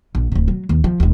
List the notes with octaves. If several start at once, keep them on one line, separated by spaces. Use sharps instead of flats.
A#1
D1 C3
F#3
D#2
F3
E1 D#2